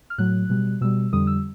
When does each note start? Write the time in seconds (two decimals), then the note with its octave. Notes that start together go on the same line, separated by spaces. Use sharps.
0.10 F6
0.18 A2 F#3 F#6
0.49 B2 G3
0.81 B2 G3 E6
1.13 F2 D3 G3 D#6
1.27 E6